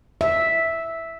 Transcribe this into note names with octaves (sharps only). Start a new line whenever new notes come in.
E5